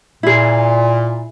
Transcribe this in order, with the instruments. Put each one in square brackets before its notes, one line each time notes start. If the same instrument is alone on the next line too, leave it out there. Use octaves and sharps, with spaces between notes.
[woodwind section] A#2 [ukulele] E4 G#4